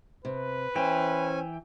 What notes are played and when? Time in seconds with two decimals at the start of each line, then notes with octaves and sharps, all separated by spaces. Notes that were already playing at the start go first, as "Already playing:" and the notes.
0.25 C3 B4
0.76 E3 C#4 C5 G5 G#5